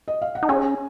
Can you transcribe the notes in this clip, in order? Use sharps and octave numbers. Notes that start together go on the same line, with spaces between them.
D#5
F5
F#5
D#4
C#4 G#4 G#5